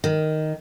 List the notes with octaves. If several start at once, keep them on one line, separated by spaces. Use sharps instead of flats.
D#3